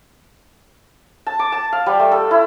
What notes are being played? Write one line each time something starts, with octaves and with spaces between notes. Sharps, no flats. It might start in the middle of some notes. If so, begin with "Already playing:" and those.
A5
D6
A5
F5
G3
A3
A4
E4